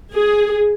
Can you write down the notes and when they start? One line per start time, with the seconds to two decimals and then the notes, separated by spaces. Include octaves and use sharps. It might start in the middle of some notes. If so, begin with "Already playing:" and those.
0.13 G#4